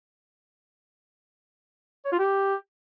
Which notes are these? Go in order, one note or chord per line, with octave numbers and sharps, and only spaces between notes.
C#5
F4
G4